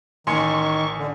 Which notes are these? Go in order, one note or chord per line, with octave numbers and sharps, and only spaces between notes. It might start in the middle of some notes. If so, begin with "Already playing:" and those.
A1 D#3 G#5 C6 C#6 C#7
D3